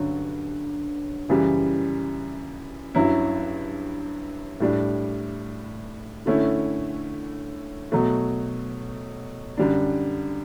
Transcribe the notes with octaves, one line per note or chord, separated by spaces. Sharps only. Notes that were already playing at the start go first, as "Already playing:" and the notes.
Already playing: G2 D3 F#3 C#4
F#2 C#3 E3 G3
G2 F#3 C#4 E4
A2 G3 D4
D3 A3 C#4 E4
B2 F#3 A3
F#2 D3 G3 D4